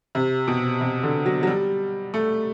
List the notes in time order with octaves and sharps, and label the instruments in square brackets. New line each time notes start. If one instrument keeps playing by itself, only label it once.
[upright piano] C3
B2
C3
D3
F#3
F#3
G3
A3